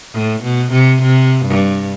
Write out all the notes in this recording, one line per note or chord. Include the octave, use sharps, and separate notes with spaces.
A2
B2
C3
C3
G2